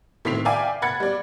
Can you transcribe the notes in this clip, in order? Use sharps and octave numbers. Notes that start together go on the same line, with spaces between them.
A2 D#3 C4 B6 C7 F7
D5 E5 F5 G5 G#5 D6
F#5 B5 G#6 A6 C#7
G3 D5